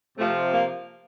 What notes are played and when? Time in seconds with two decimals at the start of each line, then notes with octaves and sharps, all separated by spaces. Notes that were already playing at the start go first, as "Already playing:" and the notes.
0.17 C3 F3 A3
0.53 A#3